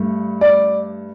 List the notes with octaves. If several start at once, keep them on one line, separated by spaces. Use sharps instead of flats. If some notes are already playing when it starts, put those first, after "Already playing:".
Already playing: G2 A3
D5